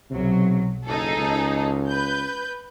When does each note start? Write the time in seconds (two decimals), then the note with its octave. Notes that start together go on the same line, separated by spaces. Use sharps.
0.11 B1 C3 F#3
0.86 F#1 D#4 G#4 A4
1.17 C#2
1.87 B4 G6